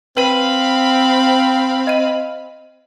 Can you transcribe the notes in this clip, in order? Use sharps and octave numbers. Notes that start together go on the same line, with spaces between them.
C4 B4 F5 G5 B5 D#7
D#5 D#7